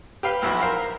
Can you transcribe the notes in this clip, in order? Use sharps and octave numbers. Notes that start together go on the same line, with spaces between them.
G4 B4 F5 G5
B1 F2 E4 F#4 B5
A#4 C5 F5